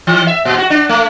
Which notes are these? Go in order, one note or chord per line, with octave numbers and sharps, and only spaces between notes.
E3
E5
A#2
F#4
D4
A3